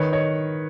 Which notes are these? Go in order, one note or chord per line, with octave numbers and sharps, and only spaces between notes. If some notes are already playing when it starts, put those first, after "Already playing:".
Already playing: D#3 B4 C#5
C#5 D#5